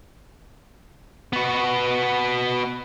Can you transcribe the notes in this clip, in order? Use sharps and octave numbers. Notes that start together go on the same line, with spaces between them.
B3 F#4